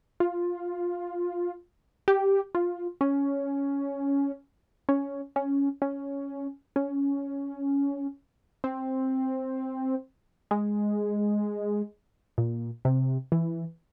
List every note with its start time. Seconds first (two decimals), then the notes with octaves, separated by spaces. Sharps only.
0.20 F4
2.08 G4
2.55 F4
3.01 C#4
4.89 C#4
5.36 C#4
5.82 C#4
6.76 C#4
8.64 C4
10.51 G#3
12.38 A#2
12.85 C3
13.32 E3